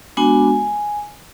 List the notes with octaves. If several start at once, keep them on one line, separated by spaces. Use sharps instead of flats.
G#3 B3 D4 F#4 G#5